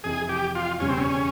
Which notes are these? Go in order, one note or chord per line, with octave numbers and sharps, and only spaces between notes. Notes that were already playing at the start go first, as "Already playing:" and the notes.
F2 C3 E3 G#4
G4
F4
E1 E2 C#3 G3 C#4
C4
C#4